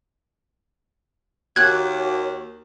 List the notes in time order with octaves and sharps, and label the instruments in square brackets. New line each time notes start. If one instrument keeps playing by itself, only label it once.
[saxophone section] D#2 [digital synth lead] F#4 [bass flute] C#5 [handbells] F#6 G#6